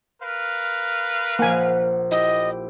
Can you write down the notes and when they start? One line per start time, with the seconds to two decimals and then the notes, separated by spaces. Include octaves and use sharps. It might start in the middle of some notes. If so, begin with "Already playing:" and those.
0.21 A#4 B4 F5
1.39 A#1 A#3 C5 F#5 G#5
2.11 E4 G4 D#5